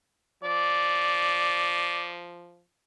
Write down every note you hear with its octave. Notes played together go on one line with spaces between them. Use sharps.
F3 D5